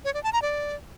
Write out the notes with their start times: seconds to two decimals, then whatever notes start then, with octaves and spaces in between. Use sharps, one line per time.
0.05 C#5
0.14 D5
0.23 A5
0.33 A#5
0.42 D5